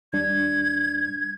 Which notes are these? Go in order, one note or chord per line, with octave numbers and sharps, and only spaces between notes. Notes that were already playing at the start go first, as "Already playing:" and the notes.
D#2 G3 D4 G#6